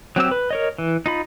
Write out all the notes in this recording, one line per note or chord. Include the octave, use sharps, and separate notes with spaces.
F#3 C4 G4 E6
B4
A#4 C#5 D#5
E3
D#4 F4 B5